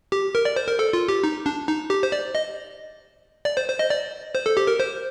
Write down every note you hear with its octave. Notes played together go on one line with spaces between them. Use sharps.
G4
A#4
D5
C5
A#4
A4
F4
G4
D#4
D4
D#4
G4
C5
D5
D#5
D5
C5
C5
D#5
D5
C5
A4
G4
A#4
C5